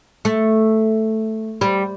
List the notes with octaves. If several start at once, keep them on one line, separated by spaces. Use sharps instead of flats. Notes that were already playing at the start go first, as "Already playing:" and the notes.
A3
G3